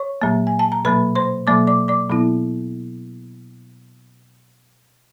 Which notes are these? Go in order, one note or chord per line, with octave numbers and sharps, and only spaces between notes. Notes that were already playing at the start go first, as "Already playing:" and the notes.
Already playing: C#5 C#6
A#2 F#3 A#3
G#5
A5
A#5
B2 F#3 A#3 B4 B5
C5 C6
B2 F#3 A#3 D5 D6
D5 D6
D5 D6
B2 F#3 B3 E4